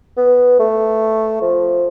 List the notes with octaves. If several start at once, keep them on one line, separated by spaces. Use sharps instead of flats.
B3
A3
F3